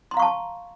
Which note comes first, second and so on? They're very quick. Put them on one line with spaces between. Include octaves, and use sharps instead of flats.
C6 A#5 F5 C#6 A5